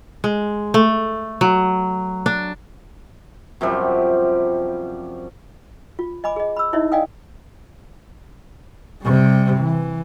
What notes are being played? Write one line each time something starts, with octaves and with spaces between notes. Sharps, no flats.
G#3
A3
F#3
D4
F#2 C3 F3 G3
F4
D#5 G#5 B5 D6
G#4 D#5
B5 E6
D#4 E4 C#5 D#5 E5
D5 D#5 F5 G5 G#5 D#6
C3 G3
E3